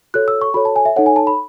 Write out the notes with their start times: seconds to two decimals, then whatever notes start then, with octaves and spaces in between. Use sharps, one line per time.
0.14 F#4 A4 C#5 F#6
0.28 E6
0.41 C#6
0.54 F#4 A4 C#5 B5
0.65 A5
0.76 G#5
0.85 E5
0.96 D#4 A4 C#5 F#5
1.06 G#5
1.16 A5
1.27 B5